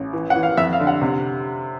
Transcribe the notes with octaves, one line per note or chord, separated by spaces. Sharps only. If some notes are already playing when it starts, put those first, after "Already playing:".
Already playing: A1
E3
F#5
E3
F5
F2 E5
F5
D3
F#5
C3